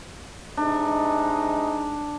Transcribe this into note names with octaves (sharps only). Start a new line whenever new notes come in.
C3 G#3 D4 D#4